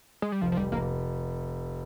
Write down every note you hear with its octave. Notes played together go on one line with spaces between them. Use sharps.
G#3
G3
F1 F3
F3
F1 G3
F1 A#3